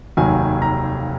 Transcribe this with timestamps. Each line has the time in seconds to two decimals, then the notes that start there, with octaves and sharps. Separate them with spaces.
0.17 F1 D#2 D#3 F#3 G#5
0.62 A#5